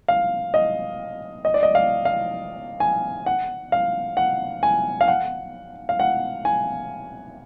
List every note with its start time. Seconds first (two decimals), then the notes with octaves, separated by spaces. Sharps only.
0.08 F5
0.54 D#5
1.45 D#5
1.54 D5
1.63 D#5
1.75 F5
2.05 F5
2.80 G#5
3.26 F#5
3.72 F5
4.17 F#5
4.63 G#5
5.01 F5
5.08 F#5
5.89 F5
6.00 F#5
6.45 G#5